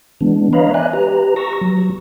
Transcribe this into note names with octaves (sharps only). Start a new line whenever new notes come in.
E3 G#3 B3 D4
B4 C#5 D#5 F5 A#5 B5
D5 E5 G#5 F#6
G4 B4 A#5
A#5 C#6 E6 A#6
F#3